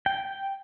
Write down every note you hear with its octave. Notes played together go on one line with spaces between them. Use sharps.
G5